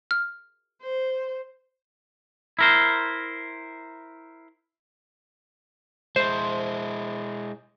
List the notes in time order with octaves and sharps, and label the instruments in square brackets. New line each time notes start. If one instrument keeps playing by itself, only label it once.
[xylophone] F6
[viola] C5
[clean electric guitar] E4 A#4 C5
[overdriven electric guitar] G#3 E4 [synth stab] C5